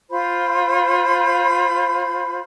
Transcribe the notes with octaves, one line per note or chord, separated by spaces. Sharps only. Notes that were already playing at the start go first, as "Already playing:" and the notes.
F4 C5 B5